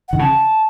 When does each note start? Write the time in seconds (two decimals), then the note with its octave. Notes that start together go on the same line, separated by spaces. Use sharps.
0.08 D#3 F#5
0.19 C#3 A5